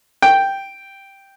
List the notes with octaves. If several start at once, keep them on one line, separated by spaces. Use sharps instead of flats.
G5